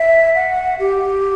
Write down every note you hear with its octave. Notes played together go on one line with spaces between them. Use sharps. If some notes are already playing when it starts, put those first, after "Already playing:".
Already playing: E5
F#5
G4